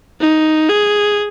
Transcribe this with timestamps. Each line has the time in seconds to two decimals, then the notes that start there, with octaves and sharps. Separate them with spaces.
0.20 D#4
0.69 G#4